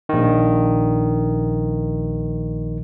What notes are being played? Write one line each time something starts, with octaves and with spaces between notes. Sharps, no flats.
A#1 D#3